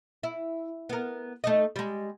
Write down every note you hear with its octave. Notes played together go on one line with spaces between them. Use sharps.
E4
B3 A#4
A3 D#4 D#5
G3 G#3